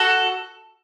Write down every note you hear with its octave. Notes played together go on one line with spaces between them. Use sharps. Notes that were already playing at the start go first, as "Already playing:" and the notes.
Already playing: F#4 A4